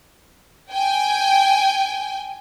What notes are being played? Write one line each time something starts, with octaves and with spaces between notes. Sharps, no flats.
G5 G#5